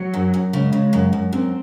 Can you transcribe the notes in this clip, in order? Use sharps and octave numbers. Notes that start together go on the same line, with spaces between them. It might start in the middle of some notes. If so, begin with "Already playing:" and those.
Already playing: F#3
F#2
F#2
C#3 G#3
C#3
F#2
F#2
F#2 C4